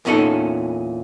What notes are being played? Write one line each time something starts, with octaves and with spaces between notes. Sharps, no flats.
E2 A#2 C#4 D#4 A4